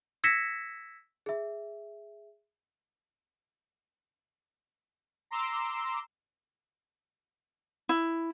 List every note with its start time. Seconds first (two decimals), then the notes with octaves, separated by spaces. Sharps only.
0.24 E6 G#6 A#6 B6 C#7 E7
1.26 G#4 E5
5.31 A#5 C6 D6 E6
7.89 E4